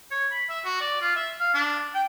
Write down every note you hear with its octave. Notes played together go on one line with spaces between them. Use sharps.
C#5
B5
E5
F#4
D5
F4
E5
F5
D4
G5